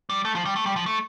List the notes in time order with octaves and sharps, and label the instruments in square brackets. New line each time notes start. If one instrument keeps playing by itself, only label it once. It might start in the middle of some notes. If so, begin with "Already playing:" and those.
[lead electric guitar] G3
A3
F3
G3
A3
G3
F3
A3